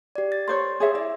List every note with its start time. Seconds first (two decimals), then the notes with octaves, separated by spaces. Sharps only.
0.16 G4 D5
0.32 A6
0.48 A#4 C5 C#5 C6
0.80 G#4 C#5 E5
0.95 E4 D5 E5